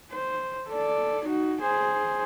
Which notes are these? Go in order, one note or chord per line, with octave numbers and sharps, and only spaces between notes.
C5
A4 D5
D#4 F#4
G#4 C5